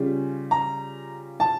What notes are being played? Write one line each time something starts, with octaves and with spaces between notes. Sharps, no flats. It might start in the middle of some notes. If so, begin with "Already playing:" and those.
Already playing: C#3 G3 C#4 F4
A#5
A5